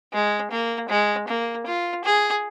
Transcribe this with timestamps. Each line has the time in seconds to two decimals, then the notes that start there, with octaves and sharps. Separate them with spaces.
0.13 G#3
0.51 A#3
0.89 G#3
1.28 A#3
1.67 F4
2.05 G#4